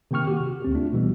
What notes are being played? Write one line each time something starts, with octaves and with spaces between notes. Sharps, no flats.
C3 D#3 A#3 G5 C#6 F6
F#4 G4
C3
D2 C4 G4
A3 D4 F4
B2 E3 G3